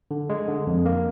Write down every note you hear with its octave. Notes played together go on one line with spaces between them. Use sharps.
D3
G#3
D3
F2
A#3